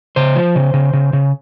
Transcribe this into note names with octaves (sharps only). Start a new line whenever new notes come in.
C#3 C5
F3
C#3
C#3
C#3
C#3